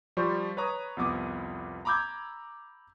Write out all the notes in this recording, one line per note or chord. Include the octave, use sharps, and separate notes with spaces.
F3 G3 C5 C#6
B4 C#5 A#5 D#6
C2 F2 B3 D6 D#6
A#5 B5 D6 E6 G6 G#6